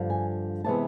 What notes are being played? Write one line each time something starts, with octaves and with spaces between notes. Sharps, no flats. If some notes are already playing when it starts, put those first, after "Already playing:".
Already playing: G2 D3 F3
G#5
C3 E3 G#3 B3 A5